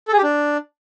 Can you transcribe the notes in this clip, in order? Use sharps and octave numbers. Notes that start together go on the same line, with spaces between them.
A4
G#4
G4
D4